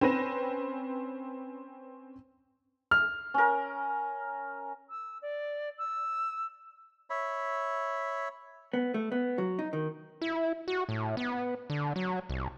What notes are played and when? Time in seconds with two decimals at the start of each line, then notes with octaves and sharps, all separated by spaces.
0.01 C4 C#4 B4 A#6 D#7 E7
2.91 F6
3.34 C#4 A#4
4.89 E6
5.21 D5
5.78 E6
7.10 C#5 E5 B5
8.73 B3
8.94 A3
9.12 B3
9.38 F#3
9.59 D#4
9.73 D#3
10.22 E4
10.68 F#4
10.89 A2
11.17 B3
11.70 D3
11.96 F#3
12.29 C2